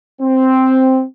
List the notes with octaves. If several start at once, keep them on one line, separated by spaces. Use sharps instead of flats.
C4